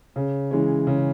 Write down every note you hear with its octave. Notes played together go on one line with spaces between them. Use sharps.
C#3
E3 G#3 C#4
C#3